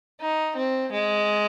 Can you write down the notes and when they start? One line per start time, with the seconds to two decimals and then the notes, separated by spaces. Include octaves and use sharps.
0.20 D#4
0.56 C4
0.92 G#3